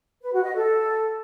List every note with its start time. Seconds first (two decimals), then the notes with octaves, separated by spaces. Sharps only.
0.22 B4
0.33 F#4
0.44 D#5
0.55 A4